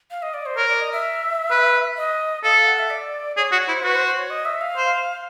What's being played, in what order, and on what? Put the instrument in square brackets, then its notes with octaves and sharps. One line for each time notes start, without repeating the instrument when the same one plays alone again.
[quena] F5
D#5
D5
C5
[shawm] A#4 [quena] C#5
[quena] D5
D#5
E5
[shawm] B4
[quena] D#5
[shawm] A4 [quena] F5
[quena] F5
F#5
E5
D5
[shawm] G#4 [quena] C#5
[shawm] F#4 [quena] C#5
[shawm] E4 [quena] C5
[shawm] F#4 [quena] B4
[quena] C5
C5
C#5
D#5
E5
F5
[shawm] C5